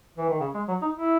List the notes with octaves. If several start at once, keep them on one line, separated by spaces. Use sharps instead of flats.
E3
D#3
C#3
G#3
F#3
D#4
E4